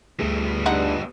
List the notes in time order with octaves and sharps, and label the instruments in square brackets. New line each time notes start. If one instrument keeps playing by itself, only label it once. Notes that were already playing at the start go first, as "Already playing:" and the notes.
[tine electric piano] D2 A3 G#4 [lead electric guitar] G3 B3
[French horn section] G2 D4 [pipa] G#3 D#4 F#5